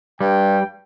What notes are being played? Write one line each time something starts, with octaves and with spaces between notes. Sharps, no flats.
G2 G3 G5